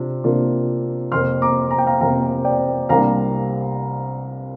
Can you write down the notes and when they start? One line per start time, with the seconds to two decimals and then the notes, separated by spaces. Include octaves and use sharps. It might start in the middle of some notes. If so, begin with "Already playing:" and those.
Already playing: C3 D4 F4
0.24 C3 A#3 D4 F4
1.12 F2 C3 A#3 C6 F6
1.42 A#5 D6
1.71 A#5
1.78 G5
1.87 F5 A#5
2.00 F2 C3 A#3 F5 A#5
2.45 D5 G5
2.89 C2 C3 G3 A#3 D4 F5 A#5